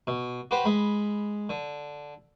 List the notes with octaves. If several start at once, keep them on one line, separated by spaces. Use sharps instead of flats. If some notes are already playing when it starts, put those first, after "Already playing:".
B2
F#4 G4 B4 C5
G#3 B5
D3